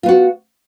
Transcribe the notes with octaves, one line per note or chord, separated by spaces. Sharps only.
B3 F4 F#4